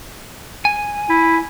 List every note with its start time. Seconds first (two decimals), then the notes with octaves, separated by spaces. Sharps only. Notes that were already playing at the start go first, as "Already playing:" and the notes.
0.65 G#5
1.09 E4